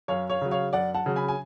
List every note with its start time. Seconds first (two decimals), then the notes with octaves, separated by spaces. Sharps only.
0.08 F#2 C#5 F5
0.30 C#5 F5
0.41 C#3 F#3
0.51 C#5 F5
0.73 F#2 D5 F#5
0.94 F#5 A5
1.06 C#3 F#3
1.16 G#5 B5
1.28 G#5